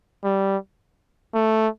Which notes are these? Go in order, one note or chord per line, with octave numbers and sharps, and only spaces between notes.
G3
A3